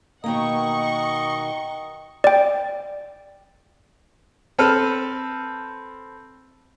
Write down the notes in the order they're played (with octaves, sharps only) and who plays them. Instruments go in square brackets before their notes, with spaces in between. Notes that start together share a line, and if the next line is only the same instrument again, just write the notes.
[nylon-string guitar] B2 D#3 A#3 [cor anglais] D#5 [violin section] F#5 C#6 [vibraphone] G5 A#5
[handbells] D5 G5
[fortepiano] C4 A4 B4 F6